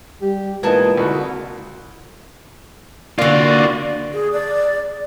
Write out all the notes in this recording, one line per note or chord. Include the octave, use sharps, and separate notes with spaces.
G3 G4
A#2 E3 G#3 B3 D#4 G#4 A5
C2 D3 F#4
D3 A#3 F4 F#4 D5
G#4
D5